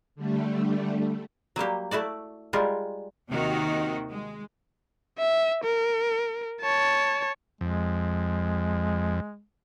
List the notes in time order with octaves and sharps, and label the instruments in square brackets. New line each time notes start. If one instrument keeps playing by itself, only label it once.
[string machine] D3 G3 A3
[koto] F#3 G3 A#3 G4
A3 E4 F#4 D5
G3 G#3 F4 A#4
[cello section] D#2 C3 D#3 F#4 D#5
G#3
[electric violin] E5
A#4
C#5 A5
[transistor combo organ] F2 [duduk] G#3